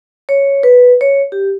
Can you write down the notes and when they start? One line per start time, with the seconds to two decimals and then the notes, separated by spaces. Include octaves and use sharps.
0.29 C#5
0.63 B4
1.01 C#5
1.32 G4